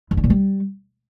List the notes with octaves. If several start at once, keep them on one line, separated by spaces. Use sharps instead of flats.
F#2
D3
A#2
G3